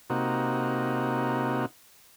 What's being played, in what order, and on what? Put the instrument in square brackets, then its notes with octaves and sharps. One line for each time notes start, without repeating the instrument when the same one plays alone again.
[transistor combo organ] C3 A#3 D#4 F#4